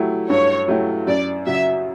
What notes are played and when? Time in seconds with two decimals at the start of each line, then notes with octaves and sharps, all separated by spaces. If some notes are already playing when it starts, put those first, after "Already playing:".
Already playing: F#3 A3 E4 G4
0.29 G2 C#5
0.68 F#3 A3 E4 G4
1.07 F#2 D5
1.46 C#3 F#3 E5